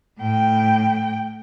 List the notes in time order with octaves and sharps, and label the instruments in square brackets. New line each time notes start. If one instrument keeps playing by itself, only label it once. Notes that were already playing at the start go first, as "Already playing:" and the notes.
[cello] A2 G5